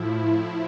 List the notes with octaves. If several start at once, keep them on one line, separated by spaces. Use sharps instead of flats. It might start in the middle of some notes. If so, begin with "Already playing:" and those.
Already playing: A2 F3 E4